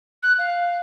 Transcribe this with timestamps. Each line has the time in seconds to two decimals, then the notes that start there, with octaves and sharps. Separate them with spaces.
0.22 F#6
0.38 F5